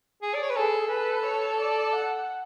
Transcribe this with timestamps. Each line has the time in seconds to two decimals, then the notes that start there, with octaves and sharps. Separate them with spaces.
0.22 G#4
0.35 D5
0.43 C#5
0.49 B4
0.56 G#4 A4
0.91 B4
1.26 C#5
1.61 D5
1.96 F#5